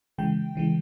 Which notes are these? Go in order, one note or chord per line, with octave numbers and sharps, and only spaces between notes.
C#3 E3 G#3 G5
C#3 E3 G#3